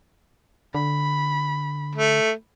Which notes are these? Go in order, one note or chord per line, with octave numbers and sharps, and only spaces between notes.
D3 B5
A3